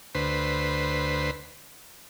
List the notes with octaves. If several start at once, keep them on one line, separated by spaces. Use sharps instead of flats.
D2 B4 C5